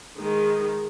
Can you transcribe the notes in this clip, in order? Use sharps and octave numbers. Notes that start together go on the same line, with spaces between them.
D#3 G#3